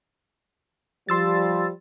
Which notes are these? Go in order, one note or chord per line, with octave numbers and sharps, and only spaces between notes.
F3 G3 C6 E6 A6